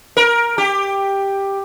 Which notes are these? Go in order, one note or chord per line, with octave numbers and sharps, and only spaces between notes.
A#4
G4